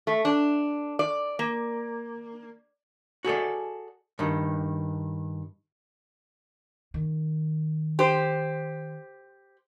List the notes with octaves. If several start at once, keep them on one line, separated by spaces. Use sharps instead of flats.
A3
D4
D5
A#3
F#4 G#4 A4 D5
G2 D#3
D#3
G4 C5